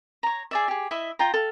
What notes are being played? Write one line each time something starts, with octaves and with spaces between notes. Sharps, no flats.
C#5 A#5
G#4 D5 E5
G4 G#4
E4 D#5 E5
F4 G5 A#5
A4 F5